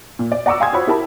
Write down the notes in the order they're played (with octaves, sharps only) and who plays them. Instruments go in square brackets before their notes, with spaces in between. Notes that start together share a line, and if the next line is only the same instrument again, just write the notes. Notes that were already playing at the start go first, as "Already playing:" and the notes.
[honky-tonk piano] A#2
D5
D5 F#5 A#5 C#6 D6 E6
F5 G5 G#5 C6 D#6 G#6
F4 F#4 C5 C#5 B5 E6
E4 G4 A#4 A5 B5